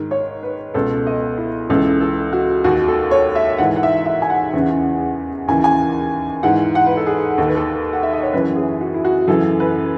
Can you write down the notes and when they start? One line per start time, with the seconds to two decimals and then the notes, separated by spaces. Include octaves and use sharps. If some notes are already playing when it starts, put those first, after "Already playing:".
Already playing: G#2 D#3
0.11 C#5
0.43 B4
0.74 C#2 B2 A4
1.07 D#5
1.38 E4
1.69 C#2 C#3 E3 A4
2.01 A4
2.33 F#4
2.64 D#2 D#3 F#4
2.88 A4
3.11 C#5
3.35 E5
3.58 G#2 E3 F#5
3.76 F#5
3.83 E5
4.06 E5
4.22 G#5
4.30 F#5
4.53 E2 C#3 E3
5.48 D#2 C#3 E3 G#5
5.64 G#5
6.43 G#2 E3 F#5
6.75 F#5
6.86 B4
6.97 A4
7.06 G#4
7.38 D#2 D#3 A4
7.48 B4
7.56 A4
7.93 F#5
8.03 E5
8.13 D#5
8.22 C#5
8.33 F#2 C#3 E3 B4
8.56 G#4
8.81 F#4
8.94 E4
9.05 F#4
9.28 F#2 C#3 E3 A4
9.60 B4